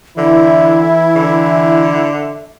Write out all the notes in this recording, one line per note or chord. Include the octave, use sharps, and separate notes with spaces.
D3 E3 E4 E5
D3